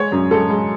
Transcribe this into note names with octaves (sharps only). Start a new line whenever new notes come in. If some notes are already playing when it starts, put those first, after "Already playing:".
Already playing: G#3 C#5
F#2
G#3 A4
G#3